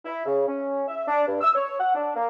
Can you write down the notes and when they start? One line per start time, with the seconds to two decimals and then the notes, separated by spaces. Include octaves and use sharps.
0.05 E4
0.26 C#3
0.47 C#4
0.88 E5
1.08 D4
1.28 G2
1.41 E6
1.55 C#5
1.80 F#5
1.95 D4
2.16 A#3